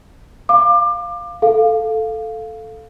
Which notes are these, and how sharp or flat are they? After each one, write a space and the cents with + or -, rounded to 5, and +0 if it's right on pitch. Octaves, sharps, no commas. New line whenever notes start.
F5 +0 D6 +30
A4 +0 F5 +0